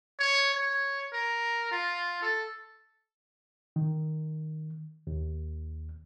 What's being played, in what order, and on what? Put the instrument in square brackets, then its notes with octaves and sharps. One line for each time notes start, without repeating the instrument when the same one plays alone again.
[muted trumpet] C#5
C#5
A#4
F4
A4
[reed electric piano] D#3
D#2